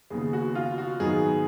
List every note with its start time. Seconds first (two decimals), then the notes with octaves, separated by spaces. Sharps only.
0.10 D#2 C#3 F3 B3 G#4
0.33 F#4
0.55 F4
0.78 F#4
1.00 G#2 D#3 F#3 B3 G#4